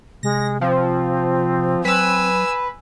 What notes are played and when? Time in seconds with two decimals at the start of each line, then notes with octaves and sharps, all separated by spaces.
0.23 C3 G#3 A#6
0.61 F3 C4
1.85 F#3 B4 G#5 E6